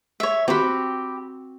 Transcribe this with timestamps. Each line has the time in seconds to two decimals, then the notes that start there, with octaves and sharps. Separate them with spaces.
0.20 C#5 E5
0.48 C4 F#4 G4 B5